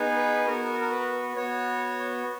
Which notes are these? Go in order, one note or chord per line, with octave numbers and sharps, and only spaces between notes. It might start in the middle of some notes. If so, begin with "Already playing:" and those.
Already playing: B3 D#4 G#4
B4
B3 F#4 A#4
A#4
B4
B3 F#4 C#5